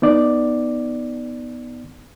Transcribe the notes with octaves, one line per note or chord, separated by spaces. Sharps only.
B3 D#4 D5